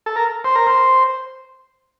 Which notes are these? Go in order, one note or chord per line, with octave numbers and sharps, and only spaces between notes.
A4
A#4
C5
A#4
C5